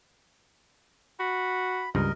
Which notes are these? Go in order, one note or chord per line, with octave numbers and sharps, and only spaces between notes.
F#4 B5
C#2 G2 A#4 D#5